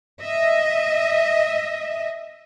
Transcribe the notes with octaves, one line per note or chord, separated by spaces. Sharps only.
D#5 E5